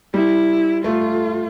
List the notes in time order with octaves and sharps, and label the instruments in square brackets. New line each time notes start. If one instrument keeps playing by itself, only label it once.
[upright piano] G3 [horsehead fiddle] E4
[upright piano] A3 [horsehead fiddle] F4